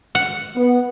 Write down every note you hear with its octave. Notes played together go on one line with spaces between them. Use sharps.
F#5
B3